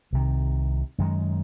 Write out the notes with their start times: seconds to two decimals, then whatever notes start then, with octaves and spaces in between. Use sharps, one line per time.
0.13 C2 C3 D#3
0.98 F#2 D#3 G#3